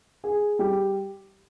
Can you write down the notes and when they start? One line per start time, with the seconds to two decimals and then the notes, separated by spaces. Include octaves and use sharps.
0.24 G#4
0.59 G3